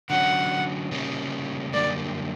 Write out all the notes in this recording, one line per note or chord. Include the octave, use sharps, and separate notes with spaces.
D3 F#3 C#4 F#5
C#3 G3 A#3 C#4
F#2 D3 G3 A#3 D5